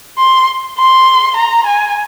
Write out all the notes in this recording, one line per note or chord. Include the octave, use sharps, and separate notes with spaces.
C6
C6
A#5
G#5